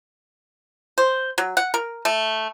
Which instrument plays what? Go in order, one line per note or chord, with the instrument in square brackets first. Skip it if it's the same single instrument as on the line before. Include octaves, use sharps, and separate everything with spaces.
[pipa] C5
F#3
F#5
A#4
A3